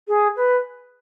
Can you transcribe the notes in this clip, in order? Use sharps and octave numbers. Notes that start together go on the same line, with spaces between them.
G#4
B4